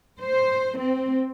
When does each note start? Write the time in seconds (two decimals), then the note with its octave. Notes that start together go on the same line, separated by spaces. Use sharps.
0.21 C5
0.78 C4